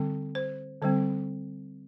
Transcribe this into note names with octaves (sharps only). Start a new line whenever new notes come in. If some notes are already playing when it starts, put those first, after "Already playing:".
Already playing: D3 G3 C4
C5
D3 G3 C4 C5